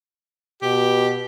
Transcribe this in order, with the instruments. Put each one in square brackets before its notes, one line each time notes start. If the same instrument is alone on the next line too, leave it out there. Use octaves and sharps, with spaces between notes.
[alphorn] B2 [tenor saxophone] G4